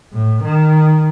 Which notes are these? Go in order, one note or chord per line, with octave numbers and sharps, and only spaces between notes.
A2
D#3